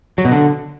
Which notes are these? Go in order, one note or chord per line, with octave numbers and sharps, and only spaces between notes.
F#3
B2
D3